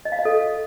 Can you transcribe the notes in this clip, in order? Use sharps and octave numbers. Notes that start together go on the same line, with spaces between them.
D#5
F5
D#5
A4